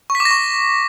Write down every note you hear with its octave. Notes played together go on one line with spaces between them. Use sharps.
C#6
B6
D6
A#6
C#6